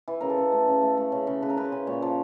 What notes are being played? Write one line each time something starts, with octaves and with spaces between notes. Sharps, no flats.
E3
C#3 A#4
A4
C#3
A3
C#3
A3
A3
C#3
C#3
C#3 B4
A#4
C#3 B4
C5
C#3
A#2 C#5
F3